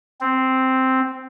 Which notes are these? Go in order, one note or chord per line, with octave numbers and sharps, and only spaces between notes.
C4